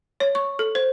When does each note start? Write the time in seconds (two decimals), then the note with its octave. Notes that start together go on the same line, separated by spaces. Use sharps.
0.20 C#5
0.35 C#6
0.59 A4
0.75 C5